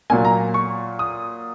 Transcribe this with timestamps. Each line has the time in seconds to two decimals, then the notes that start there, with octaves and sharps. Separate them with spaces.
0.10 A#2 F#3 A#3 G#5
0.25 A#5
0.54 C#6
0.99 D#6